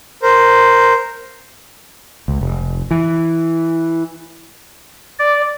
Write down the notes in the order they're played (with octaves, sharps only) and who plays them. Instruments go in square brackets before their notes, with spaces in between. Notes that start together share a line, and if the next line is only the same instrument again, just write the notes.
[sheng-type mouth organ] A#4 C5
[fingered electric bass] C#2
F1
E3
[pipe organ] D5